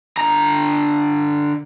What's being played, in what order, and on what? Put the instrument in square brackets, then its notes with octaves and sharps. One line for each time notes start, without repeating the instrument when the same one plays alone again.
[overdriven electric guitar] D3 A#5